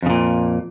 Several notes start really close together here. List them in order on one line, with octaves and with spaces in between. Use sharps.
F2 C#3 A#2